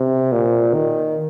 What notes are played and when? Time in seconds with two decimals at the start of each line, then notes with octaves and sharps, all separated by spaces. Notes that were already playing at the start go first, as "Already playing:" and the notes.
Already playing: C3
0.32 A#2
0.73 D#3